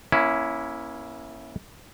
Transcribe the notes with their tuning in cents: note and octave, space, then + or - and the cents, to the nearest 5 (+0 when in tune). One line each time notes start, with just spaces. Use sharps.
A#3 +35 C#4 +0 E4 +0